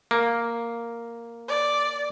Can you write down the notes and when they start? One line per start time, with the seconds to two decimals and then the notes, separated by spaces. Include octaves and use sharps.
0.11 A#3
1.48 D5